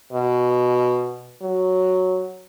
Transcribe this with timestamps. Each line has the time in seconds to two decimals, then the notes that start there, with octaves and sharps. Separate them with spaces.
0.13 B2
1.42 F#3